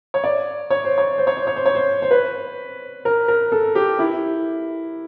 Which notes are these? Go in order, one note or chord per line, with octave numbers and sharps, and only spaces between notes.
C#5
D5
C#5
C5
C#5
C5
C#5
C5
C#5
C5
C#5
C5
C5
B4
A#4
A#4
A4
G4
E4